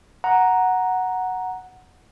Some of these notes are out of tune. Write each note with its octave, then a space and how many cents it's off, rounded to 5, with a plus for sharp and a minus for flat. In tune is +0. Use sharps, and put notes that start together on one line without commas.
F#5 +0 A#5 +0